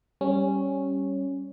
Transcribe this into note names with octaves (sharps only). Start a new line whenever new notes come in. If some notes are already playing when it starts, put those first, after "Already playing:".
G3 C#4